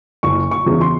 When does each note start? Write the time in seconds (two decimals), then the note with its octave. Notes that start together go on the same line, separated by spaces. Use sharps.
0.23 F#1 C#6
0.51 C#6
0.66 E2 C#3 E3
0.81 C6